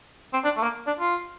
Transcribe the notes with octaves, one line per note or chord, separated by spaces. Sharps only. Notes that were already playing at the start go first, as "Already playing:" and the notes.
C4
D4
A3
A#3
D4
F4